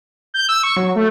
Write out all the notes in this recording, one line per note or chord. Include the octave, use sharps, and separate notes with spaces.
G6
E6
C#6
F#3
A3